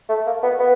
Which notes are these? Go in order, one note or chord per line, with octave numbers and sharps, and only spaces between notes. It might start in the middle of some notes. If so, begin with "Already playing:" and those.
A3
A#3
B3
B3